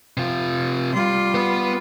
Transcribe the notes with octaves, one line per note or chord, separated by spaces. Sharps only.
C3 F4
G3 F4
B3 B4